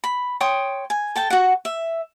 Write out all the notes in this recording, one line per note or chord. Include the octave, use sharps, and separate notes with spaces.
B5
C#5 G5 C6 D#6
G#5
A4 G5 A5
F#4 F#5
E5